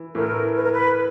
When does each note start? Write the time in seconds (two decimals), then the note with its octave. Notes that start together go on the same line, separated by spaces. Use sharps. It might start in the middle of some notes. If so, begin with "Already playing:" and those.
Already playing: E3
0.15 A2 E3 A3 A#4
0.56 B4
0.63 A#4
0.71 B4